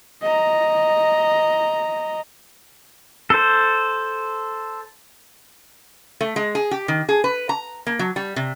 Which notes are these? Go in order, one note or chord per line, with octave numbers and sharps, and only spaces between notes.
D#5 A#5
A4 C5
A3
G#3
G#4
G4
D#3
G#4
B4
A#5
A#3
F#3
G3
C3